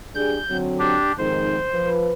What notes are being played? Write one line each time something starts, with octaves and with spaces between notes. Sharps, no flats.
G3 D4 G#4 G6
D3 F#3 C4
D4 G4
F2 G#2 D#3 C5
F3 B4